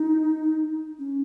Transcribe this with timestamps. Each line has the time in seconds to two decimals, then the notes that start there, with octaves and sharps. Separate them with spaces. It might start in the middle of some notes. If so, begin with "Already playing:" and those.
Already playing: D#4
0.99 C#4